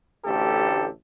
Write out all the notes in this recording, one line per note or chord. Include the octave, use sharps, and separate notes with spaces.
A1 D2 G4 A4